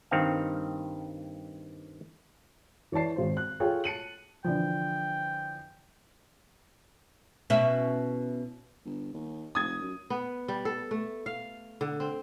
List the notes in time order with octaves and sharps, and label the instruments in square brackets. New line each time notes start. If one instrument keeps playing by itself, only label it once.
[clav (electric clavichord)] G2 D#3 C4 F5
[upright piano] E3 C#5 D5 A5 C7
G#1 C5
F#6
F4 G#4 A4 C#5 G5
A5 C#7 D#7 F#7
[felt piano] D3 E3 F3 [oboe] G5
[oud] B2 C#4 E4
[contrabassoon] G1
D#2
[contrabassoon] F1 [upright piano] D#6 G#6
[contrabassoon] F#2
[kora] B3
G3
A4
A3
F5
D3
C4